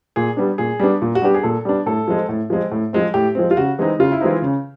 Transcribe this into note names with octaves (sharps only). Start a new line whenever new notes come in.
A#2 G#4
G3 B3 D4
A#2 G#4
G3 B3 D4
A#2
F#4
G3 B3 D4 G4
G#4
A#2 A4
G3 B3 D4
A2 A4
F3 G#3 C4
A2
F3 G#3 C4
A2
F3 G#3 C4
A2 G4
F3 G#3 C4
F4
C#3 F#4
E3 G#3 C4 D#4
C#3 F4
E4
E3 G#3 C4 D#4 F4
C#3